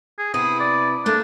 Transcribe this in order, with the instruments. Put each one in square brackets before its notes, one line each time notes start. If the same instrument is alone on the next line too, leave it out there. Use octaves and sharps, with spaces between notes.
[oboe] G#4
[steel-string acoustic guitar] C3 B3 E4 [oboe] D#6
[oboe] D5
[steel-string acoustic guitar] A3 A#3 [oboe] D4